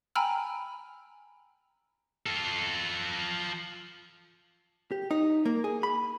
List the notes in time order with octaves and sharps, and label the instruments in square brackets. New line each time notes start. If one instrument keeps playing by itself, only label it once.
[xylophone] G5 G#5 A#5 B5 E6 F6
[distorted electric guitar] F4 A4
[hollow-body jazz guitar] G4
D#4
A#3
G#4
B5